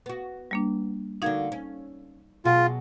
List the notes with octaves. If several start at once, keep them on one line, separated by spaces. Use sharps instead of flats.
B3 F#4
G3 A#3 D4
D3 A#3 D#4 F#4 F5 G#6
C#4
B2 F#3 F4 G#4